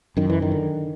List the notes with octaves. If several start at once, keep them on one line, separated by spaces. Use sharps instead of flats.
F#2 D#3
E3
D#3
D3